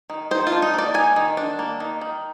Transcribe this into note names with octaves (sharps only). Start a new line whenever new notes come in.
D#3
D#3 C5
F4
D4
D#4
A#3 D5
D#3 G#5
D#3
D4
A#3
D#3
D#3